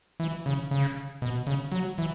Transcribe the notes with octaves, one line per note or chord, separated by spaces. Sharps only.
E3
C#3
C#3
B2
C#3
F#3
E3